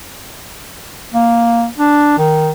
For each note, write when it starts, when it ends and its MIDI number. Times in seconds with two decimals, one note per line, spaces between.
1.14 1.66 58
1.78 2.14 62
2.18 2.52 51